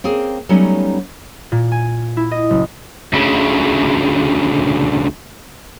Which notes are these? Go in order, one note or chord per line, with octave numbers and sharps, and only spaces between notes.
A#3 C4 C#4 G#4
F#3 G3 A3 B3 C#4 D#4
A#2
G#5
E4
D#5
F#1
D2 C#3